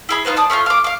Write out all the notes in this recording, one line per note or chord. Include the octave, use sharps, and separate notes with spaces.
E4 G#4 B5
D#4 F4 B4 C5
D5 A5 D#6
A3 C#4 D4 F4
F5 D6
F5 D6